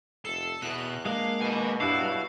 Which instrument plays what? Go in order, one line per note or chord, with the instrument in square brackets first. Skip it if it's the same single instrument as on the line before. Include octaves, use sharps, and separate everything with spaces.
[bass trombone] F1 [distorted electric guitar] A4 [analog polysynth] C7
[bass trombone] E2 [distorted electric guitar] B2 [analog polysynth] F#6
[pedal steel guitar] G#3 A#3 D4 [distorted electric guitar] F5
[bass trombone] B2 [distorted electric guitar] B4 G#5
[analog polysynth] G2 F#3 D4 [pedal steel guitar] E4 F#4 [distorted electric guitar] F5